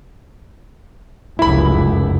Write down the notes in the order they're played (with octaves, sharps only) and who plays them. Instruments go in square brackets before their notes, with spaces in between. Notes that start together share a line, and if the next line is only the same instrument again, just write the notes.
[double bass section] F1 C#2 F#2 [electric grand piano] E4 B5